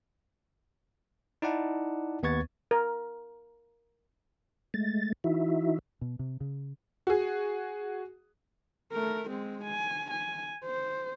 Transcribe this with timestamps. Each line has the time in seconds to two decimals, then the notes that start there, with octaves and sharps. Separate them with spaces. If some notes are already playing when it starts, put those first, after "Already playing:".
1.42 D#4 E4 D5 F#5 A5
2.23 D#2 B3 B4 C#6 G#6 A6
2.71 A#4
4.74 G#3 A3 A6
5.24 E3 D#4 E4 F#4 E5
6.01 B2
6.19 C3
6.41 C#3
7.07 F#4 G#4
8.93 A3 A#4
9.29 G#3 C4
9.64 G#5
10.11 G#5
10.64 C5